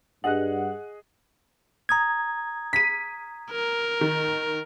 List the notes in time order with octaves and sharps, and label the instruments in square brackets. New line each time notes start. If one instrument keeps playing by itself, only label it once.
[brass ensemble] G2 [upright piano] G#4 D#5 F#6 [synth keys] F#5
[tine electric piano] A#5 D#6 G#6
[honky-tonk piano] B6 D#7
[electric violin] A#4
[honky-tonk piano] D#3